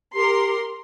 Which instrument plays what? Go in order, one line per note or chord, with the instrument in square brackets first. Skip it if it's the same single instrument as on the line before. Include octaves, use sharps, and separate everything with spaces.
[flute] G4 [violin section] A#4 C6